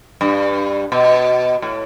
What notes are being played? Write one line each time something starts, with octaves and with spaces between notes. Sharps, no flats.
G2
B2
A2